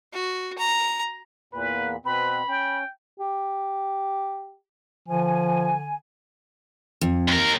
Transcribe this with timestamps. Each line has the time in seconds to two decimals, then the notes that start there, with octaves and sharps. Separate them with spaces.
0.13 F#4
0.58 A#5
1.53 E2 A#2 B4 B5
2.05 B2 C4 B4 B5
2.48 C#4 G5
3.20 G4
5.08 D3 F3 G#5
7.01 F2
7.28 D#2 A#4